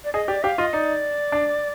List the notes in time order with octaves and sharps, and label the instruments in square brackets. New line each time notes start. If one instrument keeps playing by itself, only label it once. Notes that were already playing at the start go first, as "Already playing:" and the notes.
[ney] D5
[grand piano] G#4 [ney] D#5
[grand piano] G4 [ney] D5
[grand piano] G4 [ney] F5
[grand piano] F4 [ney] D#5
[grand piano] D#4 [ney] D5
[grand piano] D4